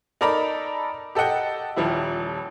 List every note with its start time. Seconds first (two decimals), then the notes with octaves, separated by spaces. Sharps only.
0.21 D#4 A4 A#4 D5 A#5 B5
1.15 G4 A4 D#5 F#5 G5
1.76 D#1 F3 G3 E4